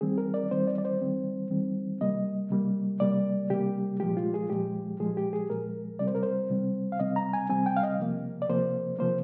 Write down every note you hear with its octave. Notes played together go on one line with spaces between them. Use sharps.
D#3 G3 C4 G#4
A#4
D5
D#3 G3 C4 C5
D5
D5
C5
D#3 G3 C4
D#3 G3 C4
C3 G3 A#3 D#5
C3 G3 A#3
C3 G3 A#3 D5
C3 G3 A#3 G4
A#2 F3 G#3 G4
F4
G#4
A#2 F3 G#3 G4
A#2 F3 G#3 G#4
G4
G#4
A#2 F3 G#3 A#4
C3 G3 C4 D5
C5
A#4
C5
C3 G3 C4
F5
C3 G3 C4 D#5
A#5
G#5
C3 G3 C4 G#5
G5
F5
D#5
C3 F3 A#3
D5
C3 F3 A#3 C5
C3 F3 A#3 C5